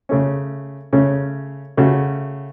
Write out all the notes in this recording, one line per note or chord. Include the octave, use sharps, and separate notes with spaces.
C#3 A3 C#4
C#3 A3 C#4
C#3 A3 F#4